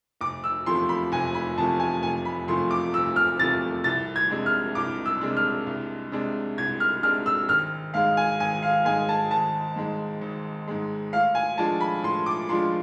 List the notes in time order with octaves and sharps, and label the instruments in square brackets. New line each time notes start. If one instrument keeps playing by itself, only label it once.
[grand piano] F1 [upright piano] D6
[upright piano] E6
[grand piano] E2 C3 F3 A3 [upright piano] C6
[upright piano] B5
[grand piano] F1 [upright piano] G#5
[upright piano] B5
[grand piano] E2 C3 F3 A3 [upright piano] A5
[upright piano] G#5
[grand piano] F1 [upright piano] G#5
[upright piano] B5
[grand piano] E2 C3 F3 A3 [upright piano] C6
[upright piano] D6
[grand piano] F1 [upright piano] E6
[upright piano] F6
[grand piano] E2 C3 F3 A3 [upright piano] A6
[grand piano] C2 [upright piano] A6
[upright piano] G#6
[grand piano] C3 G#3 D4
[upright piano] F6
[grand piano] C2 [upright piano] D6
[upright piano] E6
[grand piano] C3 G#3 D4
[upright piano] F6
[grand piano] C2
C3 G#3 D4
[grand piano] C2 [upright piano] G#6
[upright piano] F6
[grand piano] C3 G#3 D4 [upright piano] F6
[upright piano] E6
[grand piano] G#1 [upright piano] F6
[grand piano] G#2 G#3 [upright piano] F5
[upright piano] G#5
[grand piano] G#1 [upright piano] G#5
[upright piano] F5
[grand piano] G#2 G#3 [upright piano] G#5
[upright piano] A5
[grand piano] G#1 [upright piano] A5
[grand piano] G#2 G#3
G#1
G#2 G#3
[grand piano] A2 [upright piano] F5
[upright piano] G#5
[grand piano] F3 G#3 D4 F4 [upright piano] A5
[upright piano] B5
[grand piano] A2 [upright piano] C6
[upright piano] D6
[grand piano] F3 G#3 D4 F4 [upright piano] C6